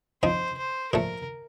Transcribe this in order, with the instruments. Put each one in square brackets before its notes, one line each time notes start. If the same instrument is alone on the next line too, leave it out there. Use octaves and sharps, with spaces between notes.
[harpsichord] F3 C4 D#4 [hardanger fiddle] C5
[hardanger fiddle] C5
[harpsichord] A#2 F3 A3 [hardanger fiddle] A#4